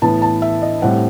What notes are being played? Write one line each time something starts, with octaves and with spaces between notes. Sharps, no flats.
A2 E3 B3 A5
A5
E5
D#5
A2 G3 C4 F#5